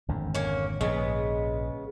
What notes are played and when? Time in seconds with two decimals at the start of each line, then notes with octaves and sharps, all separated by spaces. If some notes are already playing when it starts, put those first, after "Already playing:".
0.08 G#1 F2 D3
0.35 A#3 C#4
0.81 A#1 G#2 C#3 G#3 B3